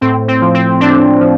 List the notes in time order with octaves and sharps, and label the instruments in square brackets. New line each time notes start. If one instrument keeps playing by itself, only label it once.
[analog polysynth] A2 C4
C4
F3
C4
A2 C4 D4
F3